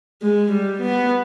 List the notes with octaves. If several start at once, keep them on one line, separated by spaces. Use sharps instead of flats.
G#3
G3
B3